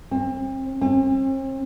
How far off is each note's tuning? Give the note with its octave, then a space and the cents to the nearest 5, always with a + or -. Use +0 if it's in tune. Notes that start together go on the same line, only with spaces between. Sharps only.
C4 +35
C4 +45